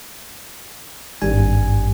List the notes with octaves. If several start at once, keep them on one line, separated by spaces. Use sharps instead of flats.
G#1 G2 G3 G#5